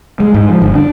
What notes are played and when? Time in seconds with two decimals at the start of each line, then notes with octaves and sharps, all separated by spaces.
0.20 G#3
0.34 G#2
0.49 F3
0.62 G1
0.75 D4